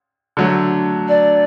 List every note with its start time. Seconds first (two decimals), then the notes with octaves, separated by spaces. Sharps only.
0.37 D3 F#3 A3
1.08 D5